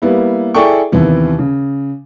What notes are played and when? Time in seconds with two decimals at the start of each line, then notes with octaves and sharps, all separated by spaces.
0.02 G3 A#3 B3 E4
0.54 E4 G#4 A4 D5 G5 C#6
0.92 D#2 C3 E3 B3
1.39 C#3